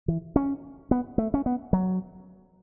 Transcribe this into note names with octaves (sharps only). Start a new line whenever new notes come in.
E3
C#4
B3
A3
C#4
B3
F#3